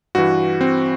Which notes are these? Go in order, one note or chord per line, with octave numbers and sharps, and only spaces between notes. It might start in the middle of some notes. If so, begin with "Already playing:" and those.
G2 E3 F#4
C4